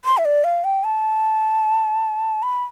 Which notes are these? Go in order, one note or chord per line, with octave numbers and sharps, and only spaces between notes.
C6
E5
D5
F5
G5
A5
B5